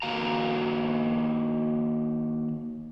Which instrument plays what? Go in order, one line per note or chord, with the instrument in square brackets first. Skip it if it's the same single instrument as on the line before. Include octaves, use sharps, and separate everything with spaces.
[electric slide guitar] D#3 A#3 F#4 F5 A#5